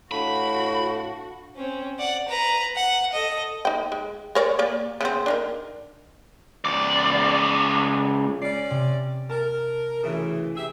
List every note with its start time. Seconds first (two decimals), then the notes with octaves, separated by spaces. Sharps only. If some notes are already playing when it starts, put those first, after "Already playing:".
0.11 A2 D4 F#4 F5 A5 B5
1.56 C4 C#4
1.99 D5 F#5
2.28 B4 A#5
2.76 F#5
3.13 A4 D#5
3.65 D#4 G5
3.92 G#3
4.35 A#4 C#5 D5
4.59 A#3 C#5 D5
5.01 C#3 B3 C4
5.26 D4 D#4 A#4
6.65 C#2 D5
8.42 C#4 D5 C7
8.70 C3
9.30 A#4 A5
10.03 D2 C#3 E3
10.55 G4 G#4 E5